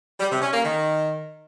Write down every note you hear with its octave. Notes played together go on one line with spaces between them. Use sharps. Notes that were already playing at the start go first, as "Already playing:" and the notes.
G3
C3
C#4
A#3
D#3